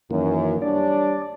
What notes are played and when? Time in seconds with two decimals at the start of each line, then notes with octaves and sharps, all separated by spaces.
0.11 F#2 D#3 E3 A#3
0.62 G3 D4 C#5 D5